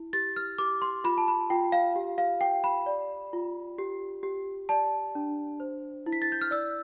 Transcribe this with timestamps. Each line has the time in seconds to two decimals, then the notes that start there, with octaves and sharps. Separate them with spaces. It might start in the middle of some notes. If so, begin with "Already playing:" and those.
Already playing: E4
0.13 G4 A6
0.36 F6
0.58 G4 D6
0.82 C6
1.04 F4 B5
1.18 A5
1.28 B5
1.50 F4 G5
1.72 F5
1.96 G4
2.18 F5
2.41 G4 G5
2.64 B5
2.86 D5
3.33 F4
3.78 G4
4.23 G4
4.69 D5 A5
5.15 D4
5.60 C5
6.06 E4
6.12 B6
6.22 A6
6.32 G6
6.41 F6
6.51 D5 E6